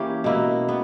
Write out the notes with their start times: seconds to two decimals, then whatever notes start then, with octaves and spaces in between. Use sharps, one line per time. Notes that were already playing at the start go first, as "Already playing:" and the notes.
Already playing: E3 A#3 C#4 G4
0.24 B2 A#3 E4
0.69 B3